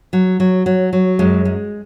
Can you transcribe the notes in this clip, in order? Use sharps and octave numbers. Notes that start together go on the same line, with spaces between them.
F#3
F#3
F#3
F#3
F#2 G#3
G#3